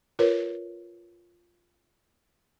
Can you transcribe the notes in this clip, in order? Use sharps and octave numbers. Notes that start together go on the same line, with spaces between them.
F4 A#4 B4 C#5